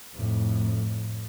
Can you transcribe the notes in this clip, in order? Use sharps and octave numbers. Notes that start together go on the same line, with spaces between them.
F2 A2